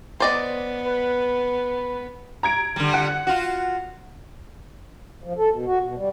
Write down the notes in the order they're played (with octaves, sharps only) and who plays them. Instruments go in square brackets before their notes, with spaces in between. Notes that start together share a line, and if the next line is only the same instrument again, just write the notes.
[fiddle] B3 [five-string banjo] C5 D5 D#5
[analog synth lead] B4
[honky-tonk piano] A#5 G#6 D7
[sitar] D3 G3
[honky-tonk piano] F#5
[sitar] F4 F#4
[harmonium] F3
A4
B2
F#4
B2
G3